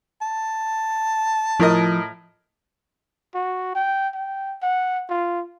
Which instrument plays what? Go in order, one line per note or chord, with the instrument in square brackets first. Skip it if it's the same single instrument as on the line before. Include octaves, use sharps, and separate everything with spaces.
[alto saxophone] A5
[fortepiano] A2 A#4 D#5 [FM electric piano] F3
[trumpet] F#4
G5
G5
F#5
F4